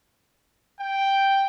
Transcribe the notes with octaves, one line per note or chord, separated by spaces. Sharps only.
G5